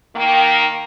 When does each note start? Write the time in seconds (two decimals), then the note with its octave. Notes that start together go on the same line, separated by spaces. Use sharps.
0.16 D#3 A#3 G5